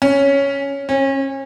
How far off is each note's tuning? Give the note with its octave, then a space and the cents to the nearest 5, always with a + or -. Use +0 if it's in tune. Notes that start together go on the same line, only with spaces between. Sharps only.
C#4 +5
C#4 -30